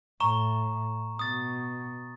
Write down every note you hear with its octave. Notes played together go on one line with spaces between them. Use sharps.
A2 A#5 C#6 E7
B2 D#6 A6